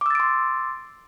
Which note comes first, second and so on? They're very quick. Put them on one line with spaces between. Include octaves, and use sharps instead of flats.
D6 E6 A6 D7 C6